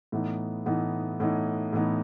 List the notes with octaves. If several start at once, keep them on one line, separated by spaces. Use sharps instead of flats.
A2 E3 B3 D#4
A2 E3 B3 D#4
A2 E3 B3 D#4
A2 E3 B3 D#4